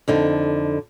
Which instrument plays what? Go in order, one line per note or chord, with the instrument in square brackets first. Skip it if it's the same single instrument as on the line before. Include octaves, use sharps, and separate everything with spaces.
[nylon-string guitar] F2 D3 D#4